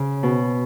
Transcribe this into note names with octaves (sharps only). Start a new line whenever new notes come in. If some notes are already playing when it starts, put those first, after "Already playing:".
Already playing: C#3
B2